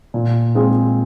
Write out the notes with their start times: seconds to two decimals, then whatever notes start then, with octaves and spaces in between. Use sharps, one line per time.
0.14 A#2
0.55 G#3 C4 F4 G#4